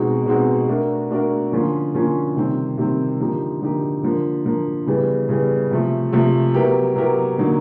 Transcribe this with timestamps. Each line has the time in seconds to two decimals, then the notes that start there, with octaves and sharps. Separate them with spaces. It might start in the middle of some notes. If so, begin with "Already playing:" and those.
Already playing: B2 G#3 C4 D#4 F#4
0.26 B2 G#3 C4 D#4 F#4
0.68 A3 D4 F#4 A#4
1.10 A3 D4 F#4 A#4
1.52 D3 F3 A#3 C#4 F4
1.94 D3 F3 A#3 C#4 F4
2.36 C3 D#3 G3 C4
2.78 C3 D#3 G3 C4
3.20 D3 F3 A#3 D#4 G4
3.62 D3 F3 A#3 D#4 G4
4.03 D3 F3 A#3
4.46 D3 F3 A#3
4.87 C#3 E3 G3 B3
5.29 C#3 E3 G3 B3
5.71 C3 F3 A3
6.13 C3 F3 A3
6.54 F#3 B3 E4 G4 A#4
6.96 F#3 B3 E4 G4 A#4
7.38 D3 F#3 A#3 D#4